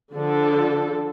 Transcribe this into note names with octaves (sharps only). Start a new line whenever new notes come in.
D3 F3 A4